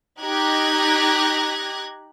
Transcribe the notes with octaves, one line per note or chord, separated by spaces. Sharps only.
D#4 G4 F#6 G#6 A#6